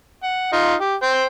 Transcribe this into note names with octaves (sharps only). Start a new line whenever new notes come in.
F#5
D#4 F4
G4
C5 G5